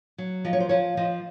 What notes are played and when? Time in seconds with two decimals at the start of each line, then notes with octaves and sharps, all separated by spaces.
0.18 F#3
0.45 F3 D#5
0.53 C#5
0.60 C5
0.69 F3 C#5
0.97 F3 D#5